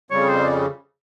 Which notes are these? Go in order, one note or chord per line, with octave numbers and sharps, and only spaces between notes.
F2 C#3 G3 C#5
C5